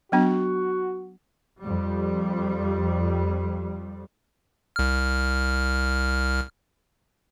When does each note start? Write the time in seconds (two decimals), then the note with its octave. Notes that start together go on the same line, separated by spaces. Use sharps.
0.12 F#3 B3 D4 F#4
1.60 F2 G3
4.76 C2 F6